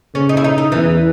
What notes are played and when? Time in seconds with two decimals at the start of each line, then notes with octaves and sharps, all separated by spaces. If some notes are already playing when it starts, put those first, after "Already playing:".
0.15 C#3 C#4
0.29 D#4
0.37 E4
0.44 D#4
0.58 D#4
0.72 E2 E3